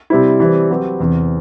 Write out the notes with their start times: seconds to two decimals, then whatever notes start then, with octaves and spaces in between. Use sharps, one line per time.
0.10 C3 G3 C4 E4
0.40 E3 G3 C4
0.70 F#3 C4 G4 B4
1.00 E2 C3 E3